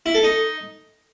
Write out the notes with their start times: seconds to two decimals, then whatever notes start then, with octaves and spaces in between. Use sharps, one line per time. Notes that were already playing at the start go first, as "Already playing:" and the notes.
0.06 E4
0.15 A4
0.23 D#4